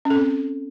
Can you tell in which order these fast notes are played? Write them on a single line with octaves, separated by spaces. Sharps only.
C#4 A4 C4